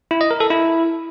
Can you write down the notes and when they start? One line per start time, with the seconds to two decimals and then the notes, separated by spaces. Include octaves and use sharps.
0.11 E4
0.21 D#5
0.31 A#4
0.40 A4
0.50 E4